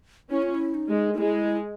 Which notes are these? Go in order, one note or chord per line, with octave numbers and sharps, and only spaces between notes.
C#4 E4
F4
E4
D#4
G#3
D#4
G#3 E4